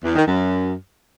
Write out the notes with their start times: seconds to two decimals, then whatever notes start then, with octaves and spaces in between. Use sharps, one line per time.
0.04 E2
0.16 D#3
0.28 F#2